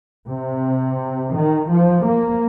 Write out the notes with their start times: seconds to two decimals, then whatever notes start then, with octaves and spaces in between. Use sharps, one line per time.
0.27 C3
1.33 D#3
1.69 F3
2.04 A#3